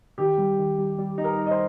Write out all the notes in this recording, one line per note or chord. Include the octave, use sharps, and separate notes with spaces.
D#3 G4
G3
D#3
G3
G3
D#4
A#4
D#4
D#5
C5